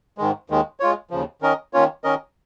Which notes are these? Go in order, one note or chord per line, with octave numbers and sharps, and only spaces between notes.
G#2 D#3 G#3
D#2 D#3 G#3
G#3 F4 C#5
D#2 C#3 F3
D#3 C#4 A#4 D#5
D#3 A#3 C#4 F4 C#5
D#3 C#4 A#4 D#5